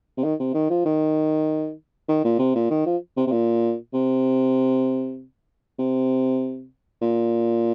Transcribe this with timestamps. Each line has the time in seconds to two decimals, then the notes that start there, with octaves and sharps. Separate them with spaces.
0.17 C3
0.23 D#3
0.39 C3
0.54 D#3
0.70 F3
0.85 D#3
2.09 D#3
2.24 A#2
2.39 C3
2.55 A#2
2.70 D#3
2.86 F3
3.16 C3
3.27 C3
3.32 A#2
3.93 C3
5.79 C3
7.01 A#2